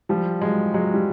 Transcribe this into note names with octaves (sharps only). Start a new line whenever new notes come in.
F3 G3
F#3 G#3
F#3 G#3
G3